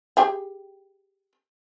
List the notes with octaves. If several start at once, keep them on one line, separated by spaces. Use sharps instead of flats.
G4 G#4 G5